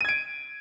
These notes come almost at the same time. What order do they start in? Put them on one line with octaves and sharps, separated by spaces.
D#7 G#6 D7